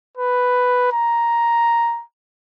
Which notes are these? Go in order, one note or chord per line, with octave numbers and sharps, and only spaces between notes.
B4
A#5